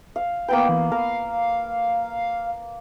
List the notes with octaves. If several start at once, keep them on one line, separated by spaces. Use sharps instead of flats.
F5
A#3 B3 B4 G5
E3
A#4 F5